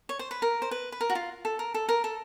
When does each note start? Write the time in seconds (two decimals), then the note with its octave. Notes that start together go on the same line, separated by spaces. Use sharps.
0.09 C#5
0.19 C5
0.31 B4
0.42 A#4
0.62 C5
0.71 B4
0.92 B4
1.01 A#4
1.10 F#4
1.15 F4
1.45 A4
1.59 A#4
1.74 A4
1.89 A#4
2.04 A4